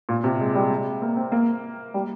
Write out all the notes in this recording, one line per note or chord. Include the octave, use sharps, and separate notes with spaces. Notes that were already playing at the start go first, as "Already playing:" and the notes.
A#2
C3
G#3
G3
A#3
C4
A#3
G3